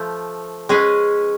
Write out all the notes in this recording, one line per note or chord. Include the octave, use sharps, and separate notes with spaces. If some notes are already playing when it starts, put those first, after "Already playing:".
Already playing: F3 A3
G#3 C#4 G#4 B4